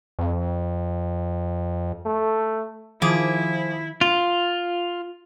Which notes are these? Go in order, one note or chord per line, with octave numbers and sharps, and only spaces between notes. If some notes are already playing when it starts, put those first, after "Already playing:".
F2
A3
D#3 F3 E4 G#4 D6
F4